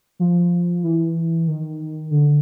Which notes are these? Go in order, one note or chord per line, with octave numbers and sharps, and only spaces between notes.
F3
E3
D#3
D3